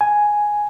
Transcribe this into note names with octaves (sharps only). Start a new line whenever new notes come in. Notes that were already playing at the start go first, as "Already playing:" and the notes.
G#5